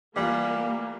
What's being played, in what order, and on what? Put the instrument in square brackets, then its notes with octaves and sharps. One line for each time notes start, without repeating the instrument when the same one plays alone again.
[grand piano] E3 F4 [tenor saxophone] G3 [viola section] A#3